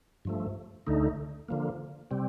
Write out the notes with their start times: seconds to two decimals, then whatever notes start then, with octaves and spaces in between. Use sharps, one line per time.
0.25 G2 F3 A3
0.87 D2 D3 A3 D#4
1.49 D3 F3 A#3
2.11 C3 G3 C4